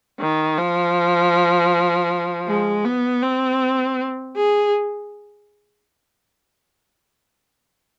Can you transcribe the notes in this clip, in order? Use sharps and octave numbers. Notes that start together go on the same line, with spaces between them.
D#3
F3
G#3
B3
C4
G#4